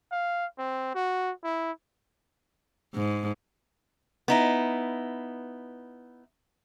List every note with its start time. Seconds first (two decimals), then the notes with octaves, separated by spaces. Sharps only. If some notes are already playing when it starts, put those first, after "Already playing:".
0.11 F5
0.58 C4
0.95 F#4
1.44 E4
2.95 G#2
4.28 B3 D#4 E4